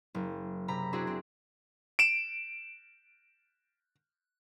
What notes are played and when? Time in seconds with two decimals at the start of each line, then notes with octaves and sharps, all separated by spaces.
0.15 F#1
0.68 C3 A#5 B5
0.93 C4 D4 E4 F#4 G#4
1.07 C4
1.99 D7 E7